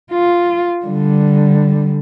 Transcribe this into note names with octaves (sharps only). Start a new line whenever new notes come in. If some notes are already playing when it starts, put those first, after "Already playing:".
F4
D3 G3